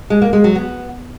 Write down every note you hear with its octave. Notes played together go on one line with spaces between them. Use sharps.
G#3
A#3
G#3
F#3
B3